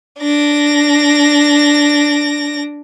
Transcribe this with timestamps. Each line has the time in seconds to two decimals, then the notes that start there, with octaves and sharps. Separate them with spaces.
0.20 D4 A#6